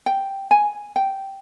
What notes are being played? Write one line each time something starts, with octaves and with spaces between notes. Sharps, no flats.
G5
G#5
G5